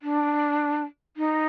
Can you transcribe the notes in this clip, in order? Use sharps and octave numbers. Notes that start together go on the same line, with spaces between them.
D4
D#4